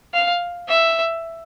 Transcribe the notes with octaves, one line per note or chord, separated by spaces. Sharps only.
F5
E5